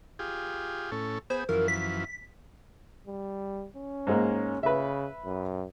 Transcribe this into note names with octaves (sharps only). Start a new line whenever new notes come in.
F4 G4 G#4
A2 C#4 A4
B3 G#4 C5
F#2 E3 F3 A#4
B6
G3
C#4
G#2 G#3 A#3
C#3 B4 E5
F#2